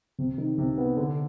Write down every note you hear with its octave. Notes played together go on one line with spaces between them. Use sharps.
C3
D#3
C3
B3
D3